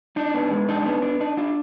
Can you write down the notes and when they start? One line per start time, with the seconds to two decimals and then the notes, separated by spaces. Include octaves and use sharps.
0.16 D4 D#4
0.34 B3
0.51 G#3
0.69 D4 D#4
0.86 B3
1.02 D4
1.20 D4 D#4
1.37 D4 F4